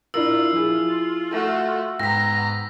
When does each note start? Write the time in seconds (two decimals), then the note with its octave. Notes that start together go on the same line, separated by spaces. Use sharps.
0.14 D4 E4 F4 A#4 E6
0.52 F3 E4 G#4
1.31 A3 F#4
2.00 G#2 B3 G5 A#5 E6 A#6 B6